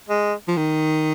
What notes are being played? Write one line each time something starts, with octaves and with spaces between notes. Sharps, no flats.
G#3
F3
D#3